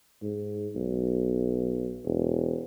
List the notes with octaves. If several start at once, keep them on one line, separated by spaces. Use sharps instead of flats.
G#2
B1
E1